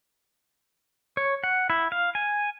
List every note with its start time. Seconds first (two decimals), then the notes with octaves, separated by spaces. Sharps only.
1.17 C#5
1.44 F#5
1.70 E4
1.92 F5
2.15 G#5